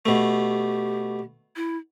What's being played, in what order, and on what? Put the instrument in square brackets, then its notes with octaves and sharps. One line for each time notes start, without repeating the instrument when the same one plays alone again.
[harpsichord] B2 A3 [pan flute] G4
[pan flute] E4